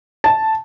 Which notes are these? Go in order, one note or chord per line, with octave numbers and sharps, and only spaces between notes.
A5